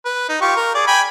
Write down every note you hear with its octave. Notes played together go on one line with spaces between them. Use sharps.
B4
D#4
F4 G4 C#6
A#4
G#4 D5
G5 G#5 B5